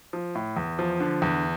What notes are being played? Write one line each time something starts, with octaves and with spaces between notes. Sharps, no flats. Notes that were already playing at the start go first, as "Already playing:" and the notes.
F3
A2
E2
F3
D3
E2